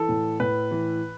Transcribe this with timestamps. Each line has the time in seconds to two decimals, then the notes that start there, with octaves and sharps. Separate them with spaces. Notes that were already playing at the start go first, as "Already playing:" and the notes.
Already playing: E3 A4
0.09 A2
0.40 A2 B4
0.71 E3